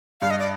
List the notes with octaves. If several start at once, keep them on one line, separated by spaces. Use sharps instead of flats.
G2 F5
D#5
D5